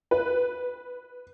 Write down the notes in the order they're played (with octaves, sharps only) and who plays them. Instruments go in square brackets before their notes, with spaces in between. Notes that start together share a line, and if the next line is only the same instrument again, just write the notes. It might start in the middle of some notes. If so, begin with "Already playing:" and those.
[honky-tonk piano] B4